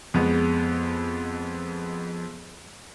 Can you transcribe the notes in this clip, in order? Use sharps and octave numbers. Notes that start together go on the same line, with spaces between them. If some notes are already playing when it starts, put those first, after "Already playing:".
F2 G#3 B3